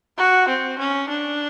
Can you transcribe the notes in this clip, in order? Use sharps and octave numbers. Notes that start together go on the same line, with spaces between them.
F#4
C4
C#4
D4